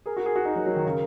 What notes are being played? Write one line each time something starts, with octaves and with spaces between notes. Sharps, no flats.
G#4 A#4
F#4
G#4
F#4
D#4
F#3
F#3
D#3
C#3